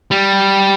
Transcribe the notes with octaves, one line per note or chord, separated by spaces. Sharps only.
G3